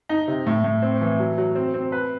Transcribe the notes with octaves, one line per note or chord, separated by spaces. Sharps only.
D#4
C3
A2
A2
C4
E3
F#3
F#3
C4
C4
B4